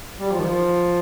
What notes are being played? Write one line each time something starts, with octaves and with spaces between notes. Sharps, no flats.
G3
F3
D#3
F3